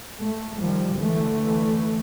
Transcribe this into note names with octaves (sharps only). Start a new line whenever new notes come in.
A3
D#3 F3 G3
D3 E3 A3